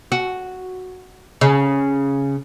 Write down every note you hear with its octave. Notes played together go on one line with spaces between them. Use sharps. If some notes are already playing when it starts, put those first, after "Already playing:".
F#4
C#3